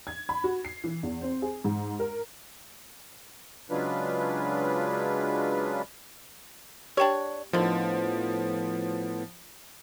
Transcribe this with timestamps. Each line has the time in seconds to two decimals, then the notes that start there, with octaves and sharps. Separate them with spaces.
0.07 G#6
0.29 B5
0.44 F#4
0.65 C7
0.84 E3
1.03 E2
1.21 C4
1.42 G#4
1.64 G#2
1.99 A#4
3.70 C#3 F#3 G#3 D4 F4 B4
6.97 D4 G4 C#5 G5
7.53 A2 D3 D#3 F3 B3